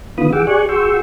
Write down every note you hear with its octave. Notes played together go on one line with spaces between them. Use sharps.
D3 D#3 B3 F4 B5 D#6
E3 G#4 F#5 G5 D6 E6
G4 G#4 D5 G#5 C#6 F#6
F#4 G#4 G5 C6 C#6 E6